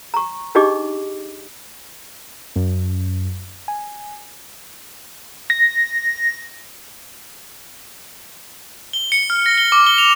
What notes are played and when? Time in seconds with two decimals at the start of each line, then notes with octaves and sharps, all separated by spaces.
0.14 A#5 C#6
0.55 D4 D#4 G4 G#4 D#5 D6
2.56 F#2
3.68 G#5
5.50 A#6
8.93 G7
9.12 C#7
9.30 F6
9.46 A#6
9.58 G7
9.72 D6
9.86 G7
9.98 F7